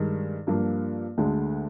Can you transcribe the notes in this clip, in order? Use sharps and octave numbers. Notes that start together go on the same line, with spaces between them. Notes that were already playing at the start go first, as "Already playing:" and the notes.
Already playing: G2 D#3 G#3 D#4
G2 F3 A#3 D4
D2 D3 G#3 D4